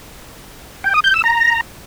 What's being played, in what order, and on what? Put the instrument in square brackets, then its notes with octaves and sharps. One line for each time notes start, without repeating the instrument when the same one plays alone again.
[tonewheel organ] G5
D#6
G6
E6
A#5